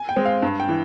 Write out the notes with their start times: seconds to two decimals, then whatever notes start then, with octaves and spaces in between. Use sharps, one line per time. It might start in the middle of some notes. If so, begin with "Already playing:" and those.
Already playing: G#5
0.09 G5
0.16 G#3 C4
0.25 F5
0.42 G2
0.60 G5
0.69 E3